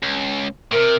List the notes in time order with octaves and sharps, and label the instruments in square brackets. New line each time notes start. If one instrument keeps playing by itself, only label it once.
[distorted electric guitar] C#2
[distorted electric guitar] A2 C3 [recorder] A#4